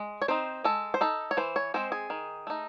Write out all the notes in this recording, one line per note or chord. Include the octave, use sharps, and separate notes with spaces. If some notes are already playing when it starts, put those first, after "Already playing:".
Already playing: G#3
C#5
C4 D#4 C5
G#3 A4
C5
D#4 A4
C#5
E3 C5
C#5
G#3 C4 C5
G#4
D#3
A3 D#4